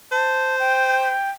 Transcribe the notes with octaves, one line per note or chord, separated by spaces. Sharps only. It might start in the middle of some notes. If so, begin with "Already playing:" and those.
C5 A5
G5